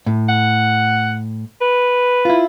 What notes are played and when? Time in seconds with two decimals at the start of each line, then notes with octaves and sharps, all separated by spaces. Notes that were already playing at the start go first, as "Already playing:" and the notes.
0.06 A2
0.29 F#5
1.61 B4
2.25 E4 F4